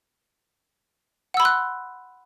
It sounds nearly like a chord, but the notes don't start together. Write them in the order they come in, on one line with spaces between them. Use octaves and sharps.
F#5 E6 B5 C6 F#6